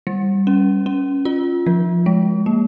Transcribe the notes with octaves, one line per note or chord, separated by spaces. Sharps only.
G3
C#4
C#4
F4
F3
G#3
A#3